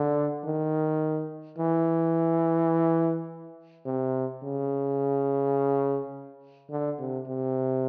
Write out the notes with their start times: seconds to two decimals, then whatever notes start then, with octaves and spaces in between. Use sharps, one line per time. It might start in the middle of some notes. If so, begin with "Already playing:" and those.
Already playing: D3
0.45 D#3
1.59 E3
3.86 C3
4.43 C#3
6.71 D3
6.99 C3
7.27 C3